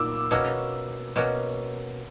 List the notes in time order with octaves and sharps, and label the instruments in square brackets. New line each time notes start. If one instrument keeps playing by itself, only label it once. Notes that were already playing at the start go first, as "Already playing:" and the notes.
Already playing: [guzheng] A#2 A#3 [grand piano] D6 E6
[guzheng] B2 A#3 C#4 F#4 [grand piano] E6
[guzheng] B2 A#3 C#4 F#4